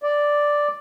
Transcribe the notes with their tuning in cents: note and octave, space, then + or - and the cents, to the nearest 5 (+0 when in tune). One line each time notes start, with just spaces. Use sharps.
D5 +0